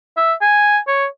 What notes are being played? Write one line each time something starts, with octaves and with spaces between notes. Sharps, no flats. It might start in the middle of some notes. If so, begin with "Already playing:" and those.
E5
G#5
C#5